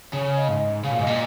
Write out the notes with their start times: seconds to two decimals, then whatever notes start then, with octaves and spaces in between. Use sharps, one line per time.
0.13 C#3 C#5
0.37 D#5
0.48 G#2
0.84 C#3 F5
0.92 A#2
0.99 G#2 D#5
1.07 A#2